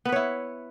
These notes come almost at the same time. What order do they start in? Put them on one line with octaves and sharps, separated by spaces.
B3 B4 C#5 E4